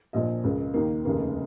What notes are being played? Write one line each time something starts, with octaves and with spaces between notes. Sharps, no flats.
A#1 A#2 F3 D#5
C#2 C#3 A#3
D#2 D#3 A#3
F1 D#2 C#3 A#3